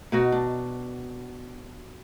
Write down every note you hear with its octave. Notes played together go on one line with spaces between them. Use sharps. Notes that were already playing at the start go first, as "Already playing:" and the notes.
B2 D#4 F#4
D4